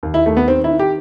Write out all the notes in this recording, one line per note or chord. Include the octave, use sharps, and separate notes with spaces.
D#2
E4
D#2 A3
B3
D#3 C4
E4
D#3
G4